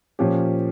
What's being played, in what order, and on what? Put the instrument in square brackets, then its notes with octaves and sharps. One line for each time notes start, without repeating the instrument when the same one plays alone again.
[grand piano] A#2 F3 C#4 G4